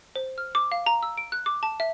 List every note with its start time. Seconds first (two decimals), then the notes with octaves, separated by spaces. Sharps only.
0.16 C5
0.38 F6
0.55 D6
0.72 F5
0.86 A#5
1.03 E6
1.17 D7
1.32 F#6
1.46 D6
1.63 A5
1.80 E5